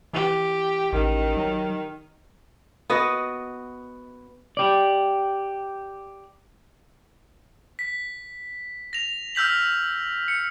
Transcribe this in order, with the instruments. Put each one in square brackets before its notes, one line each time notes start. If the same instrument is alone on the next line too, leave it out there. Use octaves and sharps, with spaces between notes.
[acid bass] E3 [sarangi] G4
[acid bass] A1 [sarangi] D#3
[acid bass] F#3
[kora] B3 F#4 D#5
[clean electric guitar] G4 D5
[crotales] B6
A#6 F7
E6 F6 G6 B6 F#7
C#7